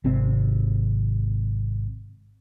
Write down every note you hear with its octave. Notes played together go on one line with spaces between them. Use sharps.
G#1 C3 C4